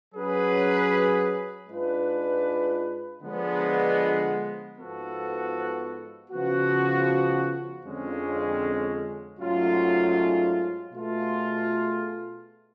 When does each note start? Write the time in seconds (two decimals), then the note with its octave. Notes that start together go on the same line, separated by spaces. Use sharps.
0.14 F#3 C#4 G#4 B4
1.68 G#2 G#3 D4 F4 B4
3.22 D3 F3 G#3 B3
4.76 G#2 F3 B3 F#4 A4
6.30 C#3 F3 B3 F#4
7.84 F2 D3 G#3 C#4
9.39 G#2 F#3 A3 C#4 F4
10.93 B2 A3 F4 G#4